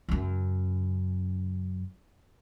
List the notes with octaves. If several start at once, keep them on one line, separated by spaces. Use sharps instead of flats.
F#2 C#3